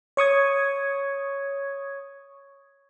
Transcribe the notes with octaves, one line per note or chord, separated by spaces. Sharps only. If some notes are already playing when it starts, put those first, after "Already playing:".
C#5 C#6 D#6 G#6